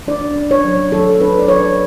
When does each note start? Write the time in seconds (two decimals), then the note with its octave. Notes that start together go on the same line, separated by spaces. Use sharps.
0.08 D4 D5
0.36 D4
0.51 C#5
0.64 F#3
0.92 F#3 A4
1.20 D4 B4
1.39 D5
1.48 F#3 C#5